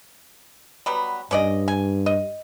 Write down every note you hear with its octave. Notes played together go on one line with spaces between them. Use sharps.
F#3 G3 B3
G2 C#4 D5 D#5
G#5
D#5